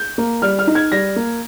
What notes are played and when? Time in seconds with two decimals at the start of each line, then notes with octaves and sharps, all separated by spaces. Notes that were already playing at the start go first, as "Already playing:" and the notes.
Already playing: G6
0.18 A#3
0.42 G3 F6
0.59 F6
0.67 D#4
0.75 G#6
0.92 G3 A#6
1.16 A#3